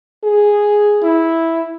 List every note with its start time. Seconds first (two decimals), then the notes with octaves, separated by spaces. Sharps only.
0.24 G#4
1.03 E4